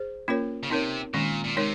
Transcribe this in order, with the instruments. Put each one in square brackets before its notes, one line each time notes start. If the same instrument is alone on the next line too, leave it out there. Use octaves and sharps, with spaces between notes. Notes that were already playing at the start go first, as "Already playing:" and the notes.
Already playing: [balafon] G#4 C5
A#3 C#4 F4 A#4 C#5
[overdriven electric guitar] C#3
[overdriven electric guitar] C3 [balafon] C4 D#4 A#4 C#5
[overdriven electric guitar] A#2 [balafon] D#3 G#3 C#4
[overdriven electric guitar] A#2
[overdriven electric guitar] C3 [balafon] G#3 D#4 A#4 C#5